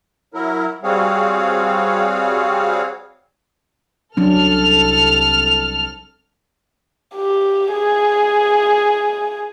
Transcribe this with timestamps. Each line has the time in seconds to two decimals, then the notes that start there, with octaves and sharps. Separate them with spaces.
0.34 F#3 E4 A#4
0.84 G3 C4 F#4 G#4 C#5 F5
4.17 C2 F#3 C#4 D4 A4 F6
7.16 G4
7.73 G#4